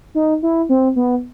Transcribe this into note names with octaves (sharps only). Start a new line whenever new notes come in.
D#4
E4
C4
B3